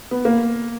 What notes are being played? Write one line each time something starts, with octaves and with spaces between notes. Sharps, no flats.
B3
A#3